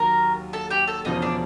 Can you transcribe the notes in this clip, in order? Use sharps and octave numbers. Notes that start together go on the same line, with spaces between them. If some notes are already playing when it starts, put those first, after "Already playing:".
Already playing: D#2 D#3 F#3 A#4 A#5
A4 A5
G4 G5
A4 A5
E1 E2 C#3 F3 D#4 D#5
D4 D5